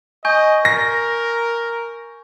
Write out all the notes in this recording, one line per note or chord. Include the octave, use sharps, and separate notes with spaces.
D#5 G#5 C#6 G6
A#4 A#6